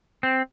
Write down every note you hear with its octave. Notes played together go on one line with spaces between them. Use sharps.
C4